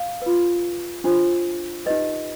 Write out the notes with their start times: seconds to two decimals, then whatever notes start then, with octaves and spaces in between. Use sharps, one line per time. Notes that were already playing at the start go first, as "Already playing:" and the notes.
Already playing: F5
0.22 F4 B4
1.04 D4 F4 C5
1.86 D#4 G4 B4 D#5